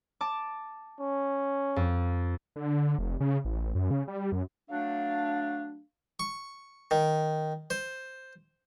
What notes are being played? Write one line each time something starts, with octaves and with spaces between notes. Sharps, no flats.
A5 D6
C#4
F2
D3
F1
C#3
A1
F#2
C#3
G3
F#2
F#3 A3 D4 F5
C#6
D#3
C5